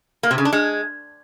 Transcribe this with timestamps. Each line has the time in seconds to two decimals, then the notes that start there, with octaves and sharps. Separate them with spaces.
0.23 A#3
0.31 C3
0.38 C#3
0.45 D4
0.53 G#3